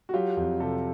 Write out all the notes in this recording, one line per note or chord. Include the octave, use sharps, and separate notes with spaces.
F#4
F#3 F4 G4
F2
C3 G4 A4